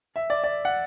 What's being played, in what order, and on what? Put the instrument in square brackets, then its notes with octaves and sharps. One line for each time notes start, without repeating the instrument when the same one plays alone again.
[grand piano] E5
D5
D5
F#5